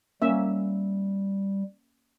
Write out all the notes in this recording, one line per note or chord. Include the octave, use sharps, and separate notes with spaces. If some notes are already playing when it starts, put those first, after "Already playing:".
G3 A#3 C#4 E5